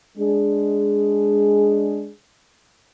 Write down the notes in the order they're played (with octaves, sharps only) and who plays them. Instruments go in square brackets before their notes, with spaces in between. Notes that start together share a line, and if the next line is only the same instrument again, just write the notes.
[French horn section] G#3 D4 G#4